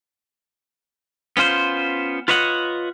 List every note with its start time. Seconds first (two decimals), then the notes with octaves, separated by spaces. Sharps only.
1.37 B3 C#4 F4 C5
2.28 F4 B4 C#5 D#5 F#5